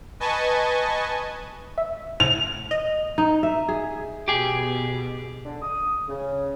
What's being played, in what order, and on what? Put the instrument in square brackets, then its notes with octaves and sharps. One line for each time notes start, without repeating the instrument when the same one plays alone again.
[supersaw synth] B4 D#5 G#5 A5 C#6
[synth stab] E5
[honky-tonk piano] F7
[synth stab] D#5
[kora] D#4
E5
G#4
[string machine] B2 [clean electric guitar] G4 G#4
[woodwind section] D3
D#6
C#3